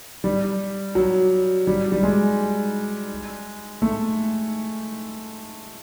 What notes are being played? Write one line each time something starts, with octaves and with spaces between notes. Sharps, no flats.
G3
F#3
G3
G3
G#3
A3